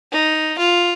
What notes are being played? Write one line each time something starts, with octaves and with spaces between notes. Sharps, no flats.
D#4
F4